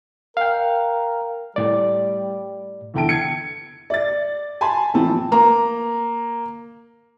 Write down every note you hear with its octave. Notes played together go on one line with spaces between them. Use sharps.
A#4 F5 G5
A2 G3 D5
E2 D3 E4 G5 A5 D7
G#6 C#7
D5 A6
G#5 A5 B5 C6
A1 F3 C4 A5
A#3 A#5